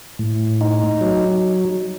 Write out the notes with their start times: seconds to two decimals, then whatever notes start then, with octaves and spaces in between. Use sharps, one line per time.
0.19 A2
0.61 D#4
1.01 F#3